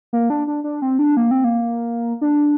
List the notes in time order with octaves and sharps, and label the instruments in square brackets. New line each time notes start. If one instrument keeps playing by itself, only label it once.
[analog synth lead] A#3
D4
D4
D4
C4
D4
A#3
C4
A#3
D4